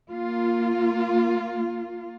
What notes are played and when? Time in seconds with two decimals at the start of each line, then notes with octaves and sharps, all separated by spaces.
0.10 A#3 F4